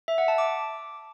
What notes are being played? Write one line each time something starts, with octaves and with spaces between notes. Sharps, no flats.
E5
F#5
A5
D6